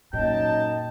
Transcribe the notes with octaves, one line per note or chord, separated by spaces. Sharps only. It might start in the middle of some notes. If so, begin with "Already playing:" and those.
F#2 A#2 D#4 D#5 G5 A5